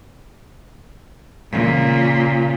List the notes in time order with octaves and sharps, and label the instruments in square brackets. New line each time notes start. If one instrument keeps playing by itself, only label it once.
[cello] A#2 C#3